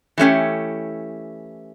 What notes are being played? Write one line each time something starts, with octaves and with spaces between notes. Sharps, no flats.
E3 A3 C#4 G4